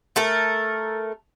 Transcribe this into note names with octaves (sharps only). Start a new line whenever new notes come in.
A3 A4 A#4